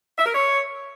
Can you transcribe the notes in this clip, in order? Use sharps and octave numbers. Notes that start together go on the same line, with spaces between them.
E5
A#4
C#5